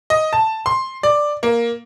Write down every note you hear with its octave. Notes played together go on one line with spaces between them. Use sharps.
D#5
A5
C6
D5
A#3